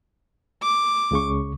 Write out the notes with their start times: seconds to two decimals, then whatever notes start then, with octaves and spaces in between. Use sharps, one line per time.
0.63 D6
1.11 C#2 C#3 C#6